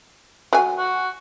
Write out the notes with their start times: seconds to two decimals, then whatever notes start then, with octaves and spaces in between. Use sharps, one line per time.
0.53 F#3 G#5
0.78 F#4